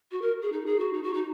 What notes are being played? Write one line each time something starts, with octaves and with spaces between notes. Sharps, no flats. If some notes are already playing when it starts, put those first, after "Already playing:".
F#4
A#4
G#4
D#4
G#4
F#4
D#4
F#4
D#4